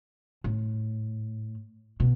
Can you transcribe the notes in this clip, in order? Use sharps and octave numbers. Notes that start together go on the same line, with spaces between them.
A2
B2